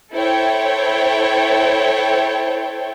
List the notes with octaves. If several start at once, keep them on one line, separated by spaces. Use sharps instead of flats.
E4 A4 C5 C#5 G5